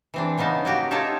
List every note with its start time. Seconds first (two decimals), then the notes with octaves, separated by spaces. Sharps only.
0.14 E3 C4 D4
0.38 C#3 B3 C#4 D#4 A5
0.65 A#3 F#4 G4
0.91 D#4 F4 G4 A4 C#5 E5